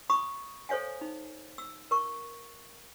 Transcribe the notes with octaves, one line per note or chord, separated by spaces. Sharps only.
B5 C#6 D#6
A4 C5 C#5 F5 G#5
D#4
E6
A#4 C#6